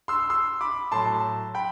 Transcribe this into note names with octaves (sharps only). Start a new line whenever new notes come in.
C6 E6
C6 E6
B5 D6
A2 F#3 A5 C6
G5 B5